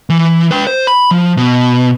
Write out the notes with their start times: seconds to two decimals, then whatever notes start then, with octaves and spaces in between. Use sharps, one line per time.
0.10 E3
0.51 B4 G5
0.67 C5
0.87 B5
1.11 F3
1.37 B2